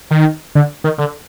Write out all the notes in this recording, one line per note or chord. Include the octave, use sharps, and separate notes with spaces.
D#3
D3
D#3
D3